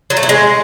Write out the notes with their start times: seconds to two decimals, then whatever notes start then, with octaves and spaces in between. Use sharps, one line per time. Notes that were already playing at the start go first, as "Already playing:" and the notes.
0.10 F#3
0.17 A3
0.23 E4
0.29 G#3